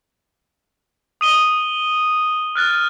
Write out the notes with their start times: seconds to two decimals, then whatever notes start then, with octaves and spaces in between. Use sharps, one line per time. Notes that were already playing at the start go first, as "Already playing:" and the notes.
1.21 D#6 D#7 G7
2.55 F6 F#6 A6